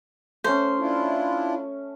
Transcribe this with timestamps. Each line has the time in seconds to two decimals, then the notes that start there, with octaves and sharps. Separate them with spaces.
0.44 A3 C#4 C5
0.79 D4 E4 F4